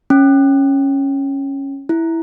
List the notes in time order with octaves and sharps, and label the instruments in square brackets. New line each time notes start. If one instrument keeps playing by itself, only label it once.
[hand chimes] C#4
E4